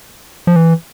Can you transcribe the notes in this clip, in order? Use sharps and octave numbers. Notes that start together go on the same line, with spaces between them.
F3
E3